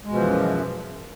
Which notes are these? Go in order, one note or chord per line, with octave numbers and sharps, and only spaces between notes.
F#2 B2 E3 F3 G#3